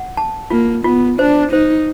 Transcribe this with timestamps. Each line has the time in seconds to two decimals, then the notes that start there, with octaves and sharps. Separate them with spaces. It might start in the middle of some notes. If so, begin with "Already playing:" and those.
Already playing: F#5
0.17 A5
0.50 A#3 F4
0.84 B3 F4
1.19 D4 C5
1.52 D#4 C5